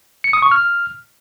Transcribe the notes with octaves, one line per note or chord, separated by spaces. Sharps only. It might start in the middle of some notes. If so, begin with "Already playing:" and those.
C#7
D#6
C#6
F6